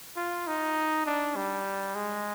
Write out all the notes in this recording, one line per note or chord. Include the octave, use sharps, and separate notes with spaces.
F4
D#4
D4
G3
G#3